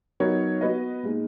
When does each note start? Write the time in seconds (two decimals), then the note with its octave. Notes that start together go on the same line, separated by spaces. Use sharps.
0.20 F#3 B3 D#4 A#4 C#5
0.61 B3 F#4 B4 D#5
1.03 A#2 G#3 D#4